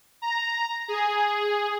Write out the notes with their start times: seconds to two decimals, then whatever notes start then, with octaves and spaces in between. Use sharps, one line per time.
0.22 A#5
0.88 G#4